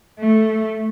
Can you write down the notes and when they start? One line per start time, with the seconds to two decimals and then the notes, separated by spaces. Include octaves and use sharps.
0.20 A3